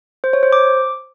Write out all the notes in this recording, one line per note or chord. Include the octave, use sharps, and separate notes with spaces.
C5
C#5
C5
D6